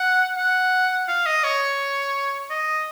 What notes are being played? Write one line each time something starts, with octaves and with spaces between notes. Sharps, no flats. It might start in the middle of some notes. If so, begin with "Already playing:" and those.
Already playing: F#5
F#5
F5
D#5
C#5
D#5